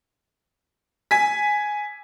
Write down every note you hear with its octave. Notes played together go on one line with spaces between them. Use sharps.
G#5 B6